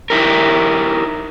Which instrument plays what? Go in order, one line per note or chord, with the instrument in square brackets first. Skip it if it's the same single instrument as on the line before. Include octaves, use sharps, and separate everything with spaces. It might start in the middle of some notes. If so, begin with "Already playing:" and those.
[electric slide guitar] D#4 E4 G4 A#4